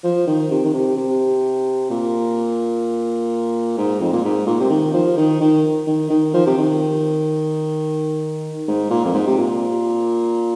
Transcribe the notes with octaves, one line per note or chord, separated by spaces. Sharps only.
F3
D#3
C3
D#3
C3
C3
A#2
G#2
F2
A#2
G#2
A#2
C3
D#3
F3
D#3
D#3
D#3
D#3
F3
C3
D#3
G#2
A#2
F2
G#2
C3
A#2